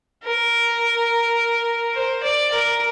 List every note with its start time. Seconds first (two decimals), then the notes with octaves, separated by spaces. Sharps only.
0.24 A#4
1.94 C5
2.23 D5
2.52 A#4